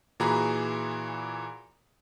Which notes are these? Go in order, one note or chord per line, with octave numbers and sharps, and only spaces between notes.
A#2 E3 F#4 G#4 A#5 B5